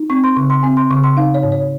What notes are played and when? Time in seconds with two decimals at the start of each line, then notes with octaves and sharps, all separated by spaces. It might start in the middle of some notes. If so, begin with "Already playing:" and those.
Already playing: D#4
0.10 C4 C#6
0.24 C6
0.36 C#3 C#6
0.50 C6
0.63 C4 G#5
0.77 C6
0.91 C#3 C#6
1.04 C6
1.17 D#4 F5
1.34 C#5
1.43 G#2
1.52 C#5